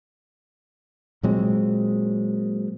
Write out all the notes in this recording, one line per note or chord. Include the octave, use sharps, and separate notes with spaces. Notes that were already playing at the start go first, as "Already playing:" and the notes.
A#2 F#3 G#3 C4